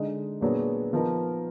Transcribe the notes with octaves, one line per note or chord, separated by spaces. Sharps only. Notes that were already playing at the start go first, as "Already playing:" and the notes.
Already playing: D3 G#3 D#4
A#2 F#3 B3 D4 G#4
F3 B3 D#4 A#4